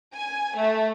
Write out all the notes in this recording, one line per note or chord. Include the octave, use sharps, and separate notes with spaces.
G#5
A3